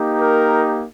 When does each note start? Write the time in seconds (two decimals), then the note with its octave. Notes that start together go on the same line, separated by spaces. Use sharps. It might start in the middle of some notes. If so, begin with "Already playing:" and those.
Already playing: A#3 D#4 G4
0.20 A#4